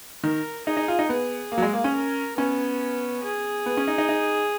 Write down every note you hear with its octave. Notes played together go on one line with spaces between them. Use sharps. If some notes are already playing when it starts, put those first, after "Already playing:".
D#3 A#4
D#4 G#4
D#4
F4
D#4
B3 G#4
A#3
F#3
G#3
A#3
C#4
A#4
B3 C#4
G#4
B3
C#4
D#4
D#4
D#4